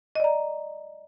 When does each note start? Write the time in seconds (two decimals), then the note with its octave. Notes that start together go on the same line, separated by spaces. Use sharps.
0.15 D#5
0.20 D5
0.24 A#5